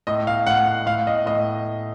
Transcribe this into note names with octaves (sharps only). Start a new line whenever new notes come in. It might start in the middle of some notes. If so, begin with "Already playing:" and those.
A2 D#5
F5
A2 F#5
F#5
A2 F5
D#5
A2 D#5